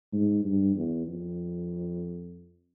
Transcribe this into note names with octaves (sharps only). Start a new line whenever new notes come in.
G#2
G2
E2
F2